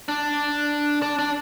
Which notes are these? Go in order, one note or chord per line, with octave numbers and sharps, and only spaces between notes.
D4
D4
D4